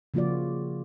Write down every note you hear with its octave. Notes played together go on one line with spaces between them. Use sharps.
C#3 F3 A#3 F4 F#4 D5